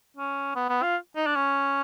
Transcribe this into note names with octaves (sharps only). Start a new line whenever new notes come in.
C#4
B3
B3
F4
D#4
D4
C#4